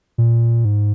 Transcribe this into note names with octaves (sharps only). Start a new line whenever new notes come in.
A#2
G#2